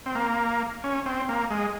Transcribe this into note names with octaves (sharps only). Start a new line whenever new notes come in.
C4
A#3
C#4
C4
A#3
G#3